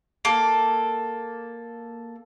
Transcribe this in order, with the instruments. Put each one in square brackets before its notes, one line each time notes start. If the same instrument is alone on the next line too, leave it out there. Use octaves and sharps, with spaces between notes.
[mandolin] A#3 A4